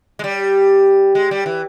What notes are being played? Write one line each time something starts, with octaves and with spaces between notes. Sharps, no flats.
G#3
G3
G#3
G3
E3